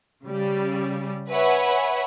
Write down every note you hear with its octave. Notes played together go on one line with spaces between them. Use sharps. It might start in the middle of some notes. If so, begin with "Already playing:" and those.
C#3 G3
B4 C#5 E5 F#5 G#5 B5